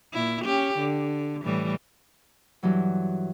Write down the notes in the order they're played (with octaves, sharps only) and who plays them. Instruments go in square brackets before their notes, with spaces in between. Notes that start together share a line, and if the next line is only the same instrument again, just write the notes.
[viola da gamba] A#2 E4
C#4 G4
D3
A2 E3 G3
[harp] G2 E3 F#3